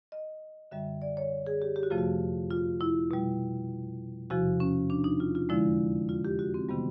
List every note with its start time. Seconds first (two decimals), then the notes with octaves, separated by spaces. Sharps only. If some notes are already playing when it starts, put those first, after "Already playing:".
0.12 D#5
0.71 F#2 D3 G3 E5
1.02 D5
1.17 C#5
1.47 G#4
1.62 G4
1.76 G4
1.83 F#4
1.90 F2 C3 F3 A3 F4
1.98 F#4
2.51 F4
2.81 E4
3.11 B2 G3
4.30 E2 C3 F3 F#4
4.60 C#4
4.90 D4
5.04 D#4
5.20 F4
5.35 F4
5.49 F2 D3 F3 G#3 E4
6.09 F4
6.25 G4
6.39 F#4
6.54 C4
6.69 C3 D#3 G3 B3